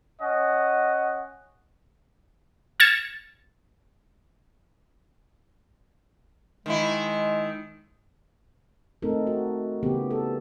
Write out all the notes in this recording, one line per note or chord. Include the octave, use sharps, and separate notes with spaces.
C#4 D#5 F#5
F6 G#6 A6 C#7 E7
D#3 G#3 E4
A3 C4 D#4 A4 A#4
F#4
C#3 E3 B3 G4
A4